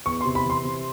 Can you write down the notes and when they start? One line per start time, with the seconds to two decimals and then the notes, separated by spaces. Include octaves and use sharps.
0.06 E2 C#6
0.21 C3 C6
0.35 B5
0.45 E3 C6
0.64 C3